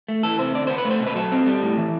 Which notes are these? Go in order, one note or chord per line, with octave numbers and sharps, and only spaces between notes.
A3
E3 A4
C3 C5
D3 D5
B3 C5
B4
A3
C5
B2
B4
F#3 A4
C4
G3
A2
E3